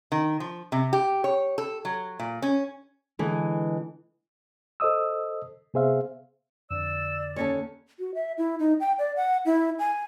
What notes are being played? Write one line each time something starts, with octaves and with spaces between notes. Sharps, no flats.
D#3
F3
C3
G4
C#5
A4
F#3
A#2
C#4
D3 E3 G#3
A4 C5 D#5 D#6 E6
C3 B3 G#4 C5 E5 F5
F2 D3 D5 E6
D#2 C#4 A4 C#5
F#4
E5
E4
D#4
G5
D5
F#5
E4
G#5